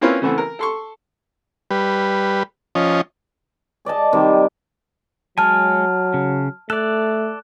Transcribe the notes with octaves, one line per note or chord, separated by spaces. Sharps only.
A#3 C4 C#4 E4 F4 B4
C#3 E3 A3 B3 C4
A#4
A4 C6 C#6
G3 B4
F3 C#4 D#5
G#4 D5 D#5 A5
C3 D#3 G3
F#3 G#3 C#5 G#5 A5 F6
C#3
A3 A4 D5 F#6